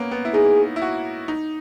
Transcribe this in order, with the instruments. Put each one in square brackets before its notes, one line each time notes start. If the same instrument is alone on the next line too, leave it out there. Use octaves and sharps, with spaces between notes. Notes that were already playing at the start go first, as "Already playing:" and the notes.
Already playing: [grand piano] A#3 B3 C#4
B3
E4
[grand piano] D#4 [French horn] G#4
[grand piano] E4
F#4
D#4